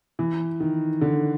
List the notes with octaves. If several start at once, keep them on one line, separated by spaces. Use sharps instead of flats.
E3
D#3
D3